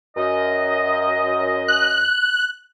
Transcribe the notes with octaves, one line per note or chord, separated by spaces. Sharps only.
F#2 D#5
F#6